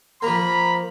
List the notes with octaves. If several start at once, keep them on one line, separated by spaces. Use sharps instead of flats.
F3 A#3 A#5 B5